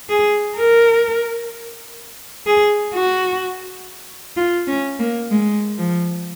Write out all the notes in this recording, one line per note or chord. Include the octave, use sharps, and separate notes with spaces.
G#4
A#4
G#4
F#4
F4
C#4
A#3
G#3
F3